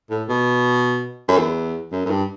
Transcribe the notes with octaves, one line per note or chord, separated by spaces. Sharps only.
A2
B2
F#2
E2
F#2
F#2
G2